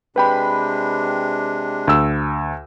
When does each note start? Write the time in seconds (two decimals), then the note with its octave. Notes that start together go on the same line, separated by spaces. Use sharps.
0.16 C3 G#3 D4 B4 G5 B5
1.87 D2 E6